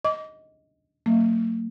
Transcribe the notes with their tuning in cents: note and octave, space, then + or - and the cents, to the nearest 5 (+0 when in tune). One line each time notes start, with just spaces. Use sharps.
D#5 +10 D6 -30
F#3 +0 A#3 -45